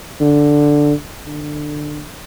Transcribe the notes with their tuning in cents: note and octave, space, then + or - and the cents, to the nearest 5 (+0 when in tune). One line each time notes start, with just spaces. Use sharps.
D3 +0
D3 +20